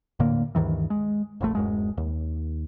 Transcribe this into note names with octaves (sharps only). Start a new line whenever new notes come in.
D#1 A2 D3 A#3
D2 G2 D#3 E3
G#3
F1 A#1 A3
D1 F#2 G#3
D#2